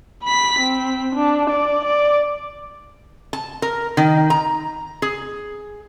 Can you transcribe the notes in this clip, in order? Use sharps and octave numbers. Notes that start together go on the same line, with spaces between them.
B5 B6
C4
D4
D5
D5
A5
A#4
D#3
A#5
G#4